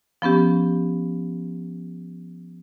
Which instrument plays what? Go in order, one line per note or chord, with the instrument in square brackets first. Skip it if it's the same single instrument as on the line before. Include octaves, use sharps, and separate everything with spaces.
[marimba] F3 B3 C#4 G4